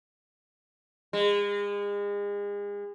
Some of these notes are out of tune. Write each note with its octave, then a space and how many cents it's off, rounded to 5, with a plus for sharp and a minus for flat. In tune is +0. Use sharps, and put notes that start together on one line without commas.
G#3 -35